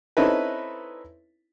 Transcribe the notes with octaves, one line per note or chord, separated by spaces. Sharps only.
C4 C#4 D#4 E4 A4 B4